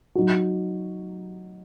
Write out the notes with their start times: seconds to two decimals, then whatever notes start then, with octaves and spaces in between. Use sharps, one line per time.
0.15 F#3 D#4 F#4